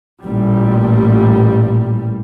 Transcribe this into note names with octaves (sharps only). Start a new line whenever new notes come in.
A1 A#2 G3